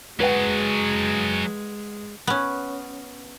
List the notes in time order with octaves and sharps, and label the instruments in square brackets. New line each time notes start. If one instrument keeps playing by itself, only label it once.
[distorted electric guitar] F#3 G#4 [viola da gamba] G#3 [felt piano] B4 F#5
[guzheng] B3 C#4